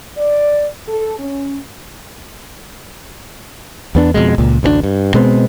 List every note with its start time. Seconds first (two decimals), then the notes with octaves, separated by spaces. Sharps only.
0.17 D5
0.87 A4
1.19 C#4
3.95 E2 B3 D4
4.14 F2 B2 G#3
4.38 C#2 A#2
4.63 A1 D2 C4 D4
4.83 G2
5.14 B2 G#3 B3 C4